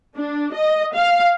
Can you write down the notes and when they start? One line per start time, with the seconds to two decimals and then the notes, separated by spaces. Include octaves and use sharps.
0.16 D4
0.54 D#5
0.95 F5